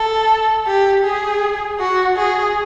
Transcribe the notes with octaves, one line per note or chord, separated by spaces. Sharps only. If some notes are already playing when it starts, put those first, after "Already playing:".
Already playing: A4
G4
G#4
F#4
G#4